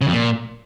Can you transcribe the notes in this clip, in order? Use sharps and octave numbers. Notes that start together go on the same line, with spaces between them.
C#3
F2
A#2